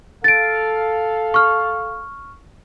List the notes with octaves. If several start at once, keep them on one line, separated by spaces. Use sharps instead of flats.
A4 F5 A6 D7
C#6 F6